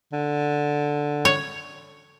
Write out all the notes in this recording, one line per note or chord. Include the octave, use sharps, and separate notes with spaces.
D3
C#5